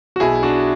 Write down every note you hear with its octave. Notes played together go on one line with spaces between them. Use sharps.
F#4
B1 B2 E4 G#4
D4 F#4